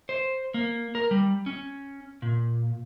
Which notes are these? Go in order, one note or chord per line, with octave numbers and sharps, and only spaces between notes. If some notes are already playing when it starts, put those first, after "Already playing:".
C5
A#3
A#4
G3
C#4
A#2